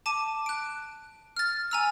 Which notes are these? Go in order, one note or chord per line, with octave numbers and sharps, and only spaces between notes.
A5 D6 D#7
F#6 D7
F6 A6
G#5 A#5 E6